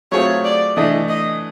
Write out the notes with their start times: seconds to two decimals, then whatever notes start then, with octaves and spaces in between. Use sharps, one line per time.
0.12 F#3 A3 C4 F4 G#4 C#5
0.44 D5
0.76 E3 A3 D4 D#5
1.08 D#5